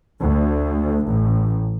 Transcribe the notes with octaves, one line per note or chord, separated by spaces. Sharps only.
D2
A1